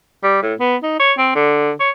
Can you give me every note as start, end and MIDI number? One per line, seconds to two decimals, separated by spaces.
0.23 0.40 55
0.42 0.54 45
0.60 0.76 59
0.83 0.95 63
1.00 1.13 73
1.18 1.31 60
1.35 1.71 50
1.80 1.90 73